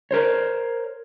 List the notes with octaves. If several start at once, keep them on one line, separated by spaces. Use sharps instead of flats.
A#4 C5 C#5